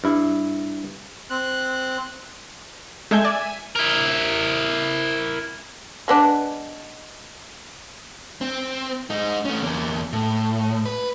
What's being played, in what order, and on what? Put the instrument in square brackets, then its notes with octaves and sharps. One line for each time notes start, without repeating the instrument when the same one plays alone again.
[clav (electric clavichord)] G2 E4
[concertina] C4 F#6
[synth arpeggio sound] G#3 A3 G6 [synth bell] E5 G#5
[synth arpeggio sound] D5
[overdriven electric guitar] E4 A#4
[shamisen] G#3 B3 D4
[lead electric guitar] C4
G#3 D#4
A3 C#4
E2 A#3
A2
B4